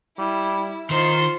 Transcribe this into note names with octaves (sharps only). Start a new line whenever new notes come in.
G3 E4
D#3 D#4 F4 C5 C6